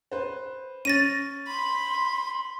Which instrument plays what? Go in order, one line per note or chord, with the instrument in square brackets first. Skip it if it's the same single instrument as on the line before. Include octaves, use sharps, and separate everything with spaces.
[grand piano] B4 C5
[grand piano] C#4 [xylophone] A6 A#6 D#7
[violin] B5 [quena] C6